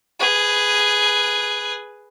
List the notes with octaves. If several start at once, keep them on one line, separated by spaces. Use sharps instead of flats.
G#4 B4